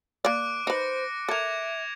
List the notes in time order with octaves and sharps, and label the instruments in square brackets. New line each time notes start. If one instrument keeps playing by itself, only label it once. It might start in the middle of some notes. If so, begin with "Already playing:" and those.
[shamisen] A#3 D5 [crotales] D6 F#6 D7
[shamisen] D#4 B4 [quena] C5 [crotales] A#6 C#7
[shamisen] A4 A#4 [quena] E5 [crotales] D6 G#6 F7